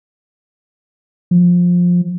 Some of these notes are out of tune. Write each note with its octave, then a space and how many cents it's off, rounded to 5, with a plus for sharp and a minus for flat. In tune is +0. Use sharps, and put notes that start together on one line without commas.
F3 +15